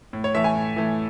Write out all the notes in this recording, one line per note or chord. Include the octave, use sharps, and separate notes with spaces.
A2
C#5
E3 A3 E5
G#5
A2
E3 A3